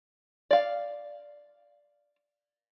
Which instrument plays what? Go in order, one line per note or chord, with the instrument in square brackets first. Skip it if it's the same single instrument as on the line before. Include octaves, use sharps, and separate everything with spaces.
[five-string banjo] D5 F5